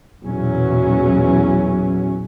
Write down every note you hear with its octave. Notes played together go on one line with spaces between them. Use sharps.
B1 E2 A#2 E3 F#3 C#4